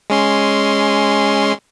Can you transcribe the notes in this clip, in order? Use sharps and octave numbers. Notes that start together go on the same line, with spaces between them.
G#3 C#4 C6